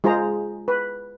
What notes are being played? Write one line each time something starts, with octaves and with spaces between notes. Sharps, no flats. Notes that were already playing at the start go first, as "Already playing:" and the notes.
G#3 F4 G#4 C5 A#5
B4